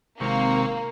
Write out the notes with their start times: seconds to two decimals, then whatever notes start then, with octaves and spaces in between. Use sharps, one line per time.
0.20 G#1 C3 A#3 C#6